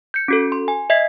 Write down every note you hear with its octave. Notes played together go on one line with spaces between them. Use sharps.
G6 C#7
C#4 F#4 A4
C6
G#5
D#5 E5 G#6 B6 C7